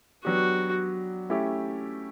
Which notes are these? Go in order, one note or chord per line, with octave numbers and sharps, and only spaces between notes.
F#3 B3 D4 F#4 G4
A3 C#4 E4 G4